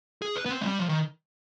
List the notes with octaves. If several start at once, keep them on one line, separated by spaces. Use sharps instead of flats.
G#4
B4
B3
C4
G#3
G3
F3
D#3